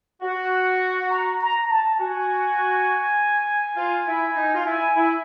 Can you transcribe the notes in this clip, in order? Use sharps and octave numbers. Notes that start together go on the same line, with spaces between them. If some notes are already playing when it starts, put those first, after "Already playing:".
F#4 F#5
A#5
A#5
A5
F#4 G#5
F4
E4
D#4
F4
E4 G#5
E4